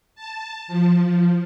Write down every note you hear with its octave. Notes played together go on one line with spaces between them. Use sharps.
A5
F3